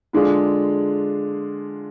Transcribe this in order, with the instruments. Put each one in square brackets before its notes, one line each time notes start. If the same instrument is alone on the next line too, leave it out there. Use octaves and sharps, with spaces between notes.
[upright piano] D3 G#3 D4 F4 G#4